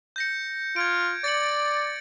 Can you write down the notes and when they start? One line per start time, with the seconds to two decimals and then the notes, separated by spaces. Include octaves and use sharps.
0.16 G6 A#6 C#7
0.76 F4 G#6 D7
1.24 D5 A6 C#7 F#7